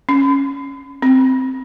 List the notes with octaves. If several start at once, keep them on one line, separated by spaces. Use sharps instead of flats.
C#4
C4